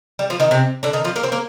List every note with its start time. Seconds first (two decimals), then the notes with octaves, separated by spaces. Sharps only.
0.19 G3
0.30 F3 F4
0.40 D#3 D#4
0.51 C3 C4
0.83 D3 D4
0.93 D#3 D#4
1.04 F3 F4
1.16 A#3 A#4
1.23 C4 C5
1.32 A#3 A#4